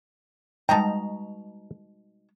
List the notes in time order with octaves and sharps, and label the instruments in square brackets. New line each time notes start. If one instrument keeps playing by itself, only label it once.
[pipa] B2 D#4 A#5 [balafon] G3 G#3 D#5 [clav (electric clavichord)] G5 A5